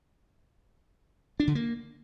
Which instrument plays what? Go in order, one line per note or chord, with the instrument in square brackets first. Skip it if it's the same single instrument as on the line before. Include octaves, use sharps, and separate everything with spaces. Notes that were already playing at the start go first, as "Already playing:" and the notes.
[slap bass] D4
D3
A#3